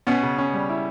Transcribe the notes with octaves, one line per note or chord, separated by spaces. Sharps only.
B2 B3 C#4
C#3
C#4
G3
E4